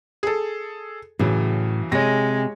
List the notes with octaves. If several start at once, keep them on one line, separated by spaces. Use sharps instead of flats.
G#4 A4
A2 C#3 E3 F#3
C3 G#3 C#5 A#6